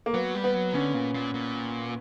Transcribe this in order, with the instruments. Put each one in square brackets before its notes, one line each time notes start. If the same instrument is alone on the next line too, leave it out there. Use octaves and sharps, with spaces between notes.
[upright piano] A#3
[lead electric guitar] F#3 [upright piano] B3
[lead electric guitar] G3
[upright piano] B3
[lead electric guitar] F#3
[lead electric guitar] D3 [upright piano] C#4
[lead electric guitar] A#2
A#2
A#2